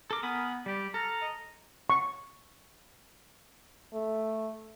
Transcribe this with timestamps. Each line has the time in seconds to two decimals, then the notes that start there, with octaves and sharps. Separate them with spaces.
0.11 A4 A#4 D6
0.23 B3 G#5 B5 D#6
0.66 G3 G4 D5
0.94 A4 A#5 F6
1.22 D#5
1.90 C#6
3.93 A3